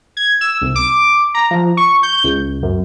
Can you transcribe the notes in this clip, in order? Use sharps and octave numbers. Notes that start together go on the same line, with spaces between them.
G#6
E6
C2
D6
A#5
F3
C#6
G6
C#2
F#2